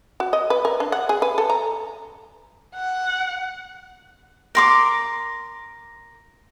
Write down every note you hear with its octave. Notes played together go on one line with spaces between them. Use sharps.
F#4
D#5
B4
A#4
D4
F#5
G#4
B4
A4
A#5
F#5
A#4 C6 D6